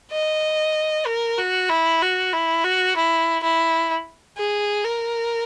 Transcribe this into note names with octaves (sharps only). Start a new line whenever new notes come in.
D#5
A#4
F#4
E4
F#4
E4
F#4
E4
E4
G#4
A#4